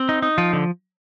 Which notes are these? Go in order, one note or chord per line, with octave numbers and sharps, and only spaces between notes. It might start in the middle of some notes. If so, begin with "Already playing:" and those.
Already playing: C4
D#4
D#4
F3 F4
D3